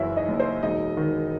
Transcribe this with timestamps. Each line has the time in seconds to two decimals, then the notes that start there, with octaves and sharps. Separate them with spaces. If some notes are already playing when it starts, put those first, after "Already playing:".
Already playing: F#1 F#2 E3 E4 F#4 E5
0.16 D#4 D#5
0.28 F#1
0.40 C5
0.62 E1 D#4 D#5
0.97 D#3